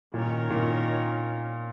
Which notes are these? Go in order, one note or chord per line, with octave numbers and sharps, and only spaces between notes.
A#2 D#3 C#4 A#4 C#5
A#2